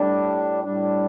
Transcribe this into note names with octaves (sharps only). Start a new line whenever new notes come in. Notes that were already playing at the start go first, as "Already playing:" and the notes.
Already playing: A2 G3 D4
A2 G3 D4